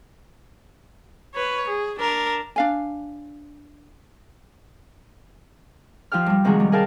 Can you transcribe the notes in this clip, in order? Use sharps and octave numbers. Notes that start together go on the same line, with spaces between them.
B4 C#5
G#4
D4 A#4
D4 F5 G#5
F3 F4 G4 G5 F6
G2 G3
C3 D#3 F3 G#3 F#4 G#4
G3
G#4 A#4 F5 G5 A5